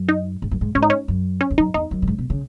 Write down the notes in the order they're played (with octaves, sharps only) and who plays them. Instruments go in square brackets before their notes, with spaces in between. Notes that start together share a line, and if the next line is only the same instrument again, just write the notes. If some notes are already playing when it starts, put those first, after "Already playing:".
Already playing: [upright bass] F#2
[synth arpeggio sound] D#4
[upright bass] G#2
F#2
G#2
[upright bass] G#2 [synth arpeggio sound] C#4
[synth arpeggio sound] D#4
C#4
[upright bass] F#2
[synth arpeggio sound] C#4
[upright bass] E2
[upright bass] F#2 [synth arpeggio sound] D#4
[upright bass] E2 [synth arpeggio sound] D#4
[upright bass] F#2
A2
G#2
B2
C#3